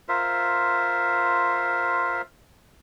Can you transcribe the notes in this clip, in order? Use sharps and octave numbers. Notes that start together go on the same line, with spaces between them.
F4 A#4 C5 E5